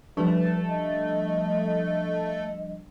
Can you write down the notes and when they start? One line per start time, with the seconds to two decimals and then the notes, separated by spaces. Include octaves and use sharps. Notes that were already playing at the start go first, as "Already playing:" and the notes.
0.17 F3 G3 A3 D4 B4
0.69 D#5